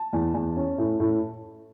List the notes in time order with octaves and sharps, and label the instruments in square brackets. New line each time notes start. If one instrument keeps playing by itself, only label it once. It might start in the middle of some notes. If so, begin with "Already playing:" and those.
Already playing: [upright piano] A5
E2
E2
C#4
A2
A2